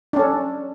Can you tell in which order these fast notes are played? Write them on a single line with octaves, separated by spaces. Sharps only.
D4 C#4 A4